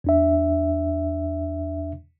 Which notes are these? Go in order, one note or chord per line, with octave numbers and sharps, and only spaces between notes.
E2 D4 E5